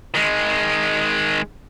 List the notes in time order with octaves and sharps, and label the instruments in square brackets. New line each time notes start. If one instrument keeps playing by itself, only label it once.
[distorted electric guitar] D#3 G#3